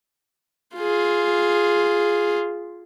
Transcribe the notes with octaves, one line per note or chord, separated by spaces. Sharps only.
F4 G#4